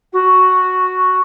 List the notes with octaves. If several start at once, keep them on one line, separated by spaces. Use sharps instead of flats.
F#4